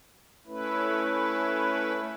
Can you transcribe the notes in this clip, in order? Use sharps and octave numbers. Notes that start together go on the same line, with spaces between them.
A3 C#4 E4 B4